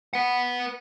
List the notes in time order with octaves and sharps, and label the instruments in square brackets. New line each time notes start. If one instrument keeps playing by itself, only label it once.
[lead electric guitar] B4 F#5